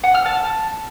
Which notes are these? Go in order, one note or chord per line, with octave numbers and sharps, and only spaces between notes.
F#5
F6
A5